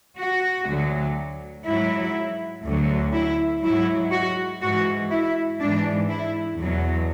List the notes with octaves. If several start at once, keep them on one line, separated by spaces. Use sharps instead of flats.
F#4
D2 D3 F#3
G#2 F#3 E4
D2 D3 F#3
E4
G#2 F#3 E4
F#4
G#2 E3 F#4
E4
G#2 E3 D4
E4
E2 B2 F#3